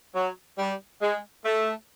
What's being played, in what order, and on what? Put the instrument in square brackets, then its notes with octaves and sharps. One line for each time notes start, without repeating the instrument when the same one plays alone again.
[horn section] F#3
G3
G#3
A3